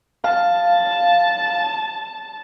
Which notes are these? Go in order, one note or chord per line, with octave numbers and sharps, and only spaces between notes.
F5 A5